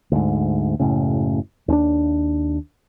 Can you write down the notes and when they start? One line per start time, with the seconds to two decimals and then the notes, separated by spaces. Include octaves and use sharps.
0.12 D2 G#2
0.80 F#1 A2 C#3
1.68 D#2 C#4 D4